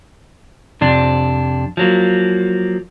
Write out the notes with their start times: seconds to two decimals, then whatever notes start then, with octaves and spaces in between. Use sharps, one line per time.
0.81 F2 C3 D4
1.77 F3 F#3 A#3